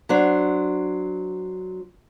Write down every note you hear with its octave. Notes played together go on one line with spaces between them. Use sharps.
F#3 D4 C5